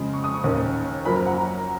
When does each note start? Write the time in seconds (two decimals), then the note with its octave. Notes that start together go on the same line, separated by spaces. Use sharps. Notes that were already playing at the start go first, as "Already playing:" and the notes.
Already playing: F2 C#3 G#3
0.13 C#6
0.24 D#6
0.34 C#6
0.44 D#2 D#3 A#3 C#4
1.05 F#2 F3 A#3 C#4 B5
1.16 A#5
1.26 F#5